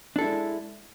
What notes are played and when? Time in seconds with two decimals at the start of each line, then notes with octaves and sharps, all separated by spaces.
0.16 D4
0.19 A4
0.21 E4
0.24 G#3